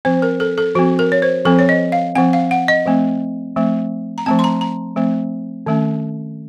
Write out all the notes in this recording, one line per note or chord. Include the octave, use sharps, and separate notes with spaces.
F3 C4 C5
A#4
A4
A4
F3 C4 F#4
A#4
C#5
C5
F3 C4 A4
C#5
D#5
F5
F3 C4 F#5
F5
F#5
D#5
F3 A3 C4
F3 A3 C4
A#5
F3 A3 C4 A5
C6
A#5
A#5
F3 A3 C4
D#3 A3 C#4